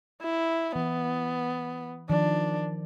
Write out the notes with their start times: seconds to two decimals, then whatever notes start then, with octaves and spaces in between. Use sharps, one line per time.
0.22 E4
0.76 E3 B3
2.10 D#3 F3 D4